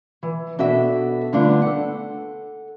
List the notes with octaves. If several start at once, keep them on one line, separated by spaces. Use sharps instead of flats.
E3
B2 D4 F#4 A4 E5
G2 D3 A3 B3 D4 F4
A4 F#5